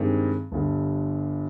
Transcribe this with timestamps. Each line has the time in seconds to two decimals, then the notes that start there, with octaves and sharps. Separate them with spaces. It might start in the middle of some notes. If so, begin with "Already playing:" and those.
Already playing: G2 D#3 G#3 C4 D#4
0.52 G1 G2 D3